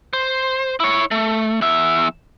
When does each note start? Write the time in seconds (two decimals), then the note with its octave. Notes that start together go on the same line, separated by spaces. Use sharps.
0.13 C5
0.80 E4 C#5
1.11 A3
1.61 E2 E5